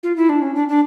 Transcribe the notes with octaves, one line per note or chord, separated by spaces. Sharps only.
F4
E4
D4
C#4
D4
D4